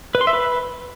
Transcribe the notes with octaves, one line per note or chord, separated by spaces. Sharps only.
B4
C6
E5
B4